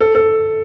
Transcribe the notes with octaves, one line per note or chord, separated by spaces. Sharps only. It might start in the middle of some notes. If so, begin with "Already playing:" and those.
A4
A4